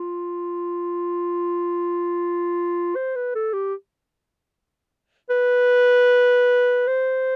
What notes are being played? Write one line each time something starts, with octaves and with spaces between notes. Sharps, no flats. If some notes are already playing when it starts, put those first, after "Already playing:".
Already playing: F4
C5
B4
A4
G4
B4
C5